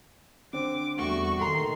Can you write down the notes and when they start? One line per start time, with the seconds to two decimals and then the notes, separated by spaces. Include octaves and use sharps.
0.53 D3 C4 D6
0.97 E2 G3 A3 F#4 C#6
1.39 A#2 D#3 A4 A#5 C6